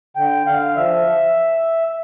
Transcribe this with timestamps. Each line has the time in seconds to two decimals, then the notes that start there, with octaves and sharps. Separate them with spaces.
0.16 D3 G5
0.47 D3 F5
0.76 F3 E5